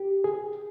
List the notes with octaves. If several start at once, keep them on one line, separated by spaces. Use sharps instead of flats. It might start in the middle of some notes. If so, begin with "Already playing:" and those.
Already playing: G4
G#4